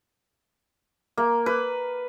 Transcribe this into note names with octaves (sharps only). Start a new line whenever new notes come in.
A#3
B4